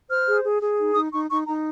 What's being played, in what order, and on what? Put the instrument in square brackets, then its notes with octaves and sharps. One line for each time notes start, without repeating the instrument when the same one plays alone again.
[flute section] C5 F6
G#4
G#4
G#4
D#4
D#4 D#6
D#4 C#6
D#4 C#6
D#4 A#5